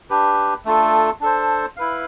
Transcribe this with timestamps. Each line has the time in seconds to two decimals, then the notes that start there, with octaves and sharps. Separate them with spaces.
0.10 D4 G4 B4
0.65 A3 D4 F4 A4
1.21 D4 A4 C5
1.77 E4 B4 F5